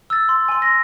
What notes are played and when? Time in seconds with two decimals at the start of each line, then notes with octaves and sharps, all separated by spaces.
0.10 E6 A6
0.29 C6
0.48 G#5 C6
0.62 A#6